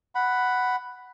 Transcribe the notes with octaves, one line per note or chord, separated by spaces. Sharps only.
F#5 B5